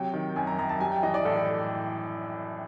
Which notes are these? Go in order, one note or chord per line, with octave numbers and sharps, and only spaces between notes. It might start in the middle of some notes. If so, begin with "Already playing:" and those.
Already playing: C3 F#3 G5
D#3
F#2 G#5
A#5
F#2 A#5
A5
G3 G#5
G5
E3 D#5
D5
A2 A4
A4